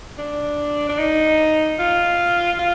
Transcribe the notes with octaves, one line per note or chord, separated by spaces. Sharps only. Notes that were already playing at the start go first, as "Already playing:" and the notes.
D4
D4
D#4
F4
F4